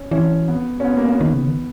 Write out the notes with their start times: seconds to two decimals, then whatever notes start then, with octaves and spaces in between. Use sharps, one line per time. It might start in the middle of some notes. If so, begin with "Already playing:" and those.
Already playing: C#4
0.11 E3 C#4
0.48 B3
0.80 C#4
0.84 B3
0.97 A#3
1.05 C#4
1.09 B3
1.21 D#3
1.34 C#3
1.45 D#3